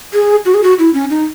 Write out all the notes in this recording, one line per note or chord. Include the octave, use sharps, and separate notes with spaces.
G#4
F#4
G#4
F#4
E4
C#4
D#4